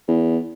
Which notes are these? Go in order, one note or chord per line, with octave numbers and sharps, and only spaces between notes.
E2